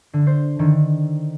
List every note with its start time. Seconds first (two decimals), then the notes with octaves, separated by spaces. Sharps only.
0.13 D3
0.27 C5
0.59 D3 D#3